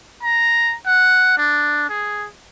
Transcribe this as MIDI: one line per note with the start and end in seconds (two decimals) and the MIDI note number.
0.22 0.75 82
0.87 1.34 78
1.38 1.86 62
1.89 2.26 68